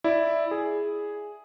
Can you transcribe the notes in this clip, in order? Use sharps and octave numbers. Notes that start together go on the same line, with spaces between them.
E4 D5
G#4